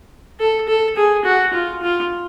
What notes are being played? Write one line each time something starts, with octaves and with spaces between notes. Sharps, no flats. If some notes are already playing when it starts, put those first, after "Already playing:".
A4
A4
G#4
F#4
F4
F4